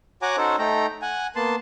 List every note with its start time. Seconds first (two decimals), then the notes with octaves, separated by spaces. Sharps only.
0.22 F#4 C#5 F#5 G#5 A#5 D6
0.37 C#4 D#4 F#4 A4 C5 C#5
0.59 A3 D#4 G5 A#5
1.02 F#5 G#5
1.36 A#3 B3 A5 C6